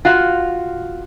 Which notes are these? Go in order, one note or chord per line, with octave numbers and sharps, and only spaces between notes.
F4 F#4 F5